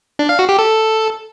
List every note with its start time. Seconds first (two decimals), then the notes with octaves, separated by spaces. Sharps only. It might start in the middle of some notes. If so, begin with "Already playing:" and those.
0.19 D4
0.29 F5
0.39 F#4
0.49 G4
0.59 A4